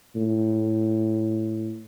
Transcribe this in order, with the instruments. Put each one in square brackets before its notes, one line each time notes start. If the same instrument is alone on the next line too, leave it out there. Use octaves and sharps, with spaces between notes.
[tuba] A2